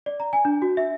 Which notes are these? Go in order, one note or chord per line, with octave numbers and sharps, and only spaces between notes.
D5
A#5
G#5
D4
F#4
E5